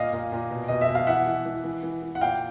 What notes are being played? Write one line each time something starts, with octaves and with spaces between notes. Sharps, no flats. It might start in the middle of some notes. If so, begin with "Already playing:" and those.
Already playing: A#2 D#5 F5
A#2
A#2
B2
B2 D#5
E5
B2
F5
E3 E5 F#5
E3
E3
E3
E3
E3
F#5
A#2 F5 G5